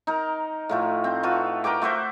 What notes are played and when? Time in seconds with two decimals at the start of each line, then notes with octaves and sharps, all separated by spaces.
0.07 D#4 A#4
0.69 A2 F3 A3
1.04 C4
1.23 F4 F#4 A4 B4
1.64 A#4 B4 G5 D6
1.82 A3 F#4 C5 E5